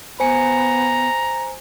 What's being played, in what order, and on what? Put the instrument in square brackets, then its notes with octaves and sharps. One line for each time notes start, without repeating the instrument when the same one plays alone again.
[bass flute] B3 [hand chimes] C5 G#5 C#7 [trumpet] A#5